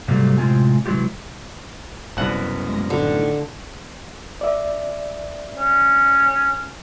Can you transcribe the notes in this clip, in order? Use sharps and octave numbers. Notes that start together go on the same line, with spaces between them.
G#2 C3 F#3 G3 A3 A#3
A2 C3 G#3 C4 F4 G#5
C3 E3 F#3 G#3 F4 G4
C2 F#2 B2 F#5
G#3 A#3 A#6
A2 D3 D#3
D5 E5
C#4